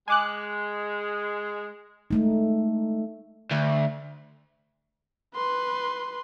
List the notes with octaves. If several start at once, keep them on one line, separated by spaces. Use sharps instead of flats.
G#3 G#5 D6 F#6
G#3 A3 D#4
D2
B4 C6